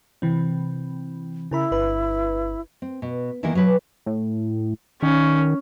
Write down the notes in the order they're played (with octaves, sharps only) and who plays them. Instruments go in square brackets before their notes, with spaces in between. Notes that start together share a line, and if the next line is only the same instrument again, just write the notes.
[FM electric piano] C3 E3 C4
[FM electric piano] C#3 A#4 B5 [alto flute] E4
[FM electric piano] G1 B4
[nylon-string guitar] C4
B2
D#3 E3 A#3 B3 E4 A#4
F#3 G#4 B4
[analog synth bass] A2
[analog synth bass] D#3 [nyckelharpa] C#4